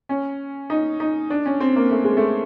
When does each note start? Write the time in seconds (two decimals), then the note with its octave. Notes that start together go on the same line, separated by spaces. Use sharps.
0.09 C#4
0.70 D#4
1.00 D#4
1.30 D4
1.46 C#4
1.60 C4
1.76 A#3
1.91 A3
2.04 G#3
2.17 A3